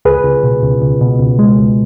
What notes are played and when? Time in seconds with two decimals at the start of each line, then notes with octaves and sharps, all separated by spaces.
0.05 C#2 G#4 B4
0.24 C#2
0.43 B2
0.62 C#2
0.82 C#2
1.01 B2
1.19 C#2
1.39 G#3
1.58 C#2